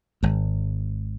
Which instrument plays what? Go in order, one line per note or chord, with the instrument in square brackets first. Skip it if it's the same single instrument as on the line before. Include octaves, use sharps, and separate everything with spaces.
[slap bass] G#1 G#2